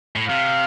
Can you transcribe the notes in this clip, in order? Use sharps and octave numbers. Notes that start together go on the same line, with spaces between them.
A2
C3 F5